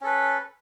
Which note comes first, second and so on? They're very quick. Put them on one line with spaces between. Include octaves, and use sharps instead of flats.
C#4 A4 B4